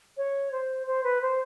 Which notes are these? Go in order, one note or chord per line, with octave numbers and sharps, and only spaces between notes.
C#5
C5
C5
B4
C5